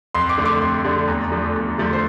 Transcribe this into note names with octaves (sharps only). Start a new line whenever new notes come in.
F2 C6
D6
D3 A3
D6
F2 C6
D3 A3
E2 A#5
D3 F3 A3
E2
D3 F3 A3
C5